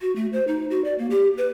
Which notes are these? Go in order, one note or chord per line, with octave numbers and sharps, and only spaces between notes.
F#4
A3
C5
D#4
F#4
D5
A#3
G4
B4